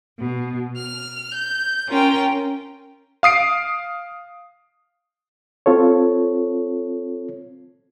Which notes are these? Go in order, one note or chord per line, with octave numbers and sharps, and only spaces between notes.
B2
F6
G6
C#4 F4 A#4 G5
F5 D#6 C7 D7
C4 F4 A4 C#5